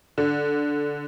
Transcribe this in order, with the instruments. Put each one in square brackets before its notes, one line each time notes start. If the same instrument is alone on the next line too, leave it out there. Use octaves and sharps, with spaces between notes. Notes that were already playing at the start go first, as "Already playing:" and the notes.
[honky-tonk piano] D3